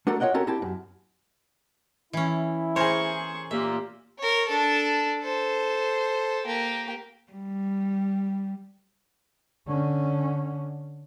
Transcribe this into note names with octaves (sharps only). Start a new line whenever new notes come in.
A3 D4 F#4 A4 A#4
F4 C#5 D#5 F#5 G5
C4 C#4 F#4 G4 A4 A#4
C4 E4 G4 G5 A5
F#2
E3 C#4 E4
G#4 A#4 C5 C#5 C#6
A#2 A#3 G4 E5
A#4 C#5
D4 A4
A4 C5
A#3 G4
G3
D3 C#4